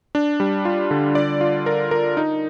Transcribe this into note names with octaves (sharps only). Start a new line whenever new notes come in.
D4
G3
F4
D3
D5
F4
A#4
A#4
D#4